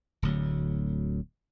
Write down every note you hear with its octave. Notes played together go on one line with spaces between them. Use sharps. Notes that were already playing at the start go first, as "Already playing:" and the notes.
D1 D2 F#3